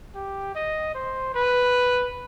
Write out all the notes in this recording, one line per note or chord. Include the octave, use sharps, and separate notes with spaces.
G4
D#5
C5
B4